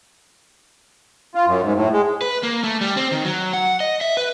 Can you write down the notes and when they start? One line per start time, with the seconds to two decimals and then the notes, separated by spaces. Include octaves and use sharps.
1.35 F4
1.47 F#2
1.63 G#2
1.76 A2
1.93 G#3
2.21 B4
2.43 A#3
2.64 A3
2.81 G3
2.97 C4
3.12 D#3
3.25 F#3
3.53 F#5
3.80 D#5
4.01 E5
4.17 B4